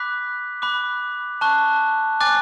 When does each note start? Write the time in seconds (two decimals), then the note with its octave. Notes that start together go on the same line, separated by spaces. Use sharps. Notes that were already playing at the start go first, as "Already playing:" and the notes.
Already playing: B5 D6 F#6 B6
0.62 B5 D6 F#6
1.41 A5 C#6 F#6
2.21 G#5 D6 F#6 A6